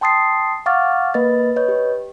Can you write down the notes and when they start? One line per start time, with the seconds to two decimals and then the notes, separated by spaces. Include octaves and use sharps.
0.01 G5 A5 C6 D#6 A6 C7
0.66 F5 F#5 C#6 D6 F6 A6
1.14 A#3 B4 D#5 A6
1.56 B4 C#5 D#5 G6
1.68 G4